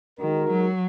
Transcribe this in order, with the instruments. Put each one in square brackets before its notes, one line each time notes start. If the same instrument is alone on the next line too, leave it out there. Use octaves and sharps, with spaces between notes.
[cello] D#3 [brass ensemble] G#3 D#4 F#4 A#4
[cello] F#3